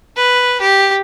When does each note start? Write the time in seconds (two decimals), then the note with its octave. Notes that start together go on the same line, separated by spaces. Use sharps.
0.16 B4
0.61 G4